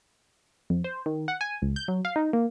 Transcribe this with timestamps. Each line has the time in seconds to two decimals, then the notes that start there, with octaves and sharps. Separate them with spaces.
0.70 F2
0.84 C5
1.06 D#3
1.28 F#5
1.41 G#5
1.62 C#2
1.76 G6
1.88 F#3
2.05 F5
2.16 D#4
2.33 A#3